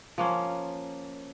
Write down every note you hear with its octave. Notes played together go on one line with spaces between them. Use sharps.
F3 A#3 C#4